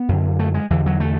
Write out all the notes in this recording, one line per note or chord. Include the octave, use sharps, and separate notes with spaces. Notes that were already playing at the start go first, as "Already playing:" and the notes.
Already playing: B3
F#2 D3
A3
G#3
E2 D3 E3
F#3
A3